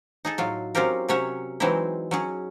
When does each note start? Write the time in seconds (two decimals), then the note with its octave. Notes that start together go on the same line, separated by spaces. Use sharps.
0.25 D#4 G#4 A4
0.38 A2 F#3 F4
0.75 F#3 C4 C#4 F4 G4 A#4
1.08 C3 F#3 C#4 C#5 E5 F#5
1.60 E3 F#3 G#3 C4 D#4 E4
2.11 F#3 C#4 G#4